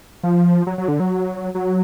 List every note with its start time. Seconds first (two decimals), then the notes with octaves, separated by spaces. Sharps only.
0.23 F3
0.67 F#3
0.78 F#3
0.88 D3
1.00 F#3
1.55 F#3